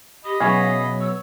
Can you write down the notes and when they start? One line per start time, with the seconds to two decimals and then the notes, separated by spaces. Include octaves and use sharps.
0.25 G4 D#5 B5
0.40 B2 E3 F#3 B3 C#4 G#4 F5
1.00 C#5 E6